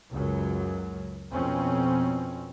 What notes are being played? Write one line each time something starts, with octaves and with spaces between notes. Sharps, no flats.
C#2 F#2 F#3
F2 B2 C4 C#4